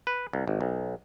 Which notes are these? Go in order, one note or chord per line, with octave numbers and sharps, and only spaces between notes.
B4
C2
G#1
B1